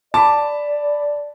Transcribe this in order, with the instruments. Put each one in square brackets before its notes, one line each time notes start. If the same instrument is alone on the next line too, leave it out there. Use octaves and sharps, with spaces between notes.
[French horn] D5 [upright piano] A5 [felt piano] B5 D6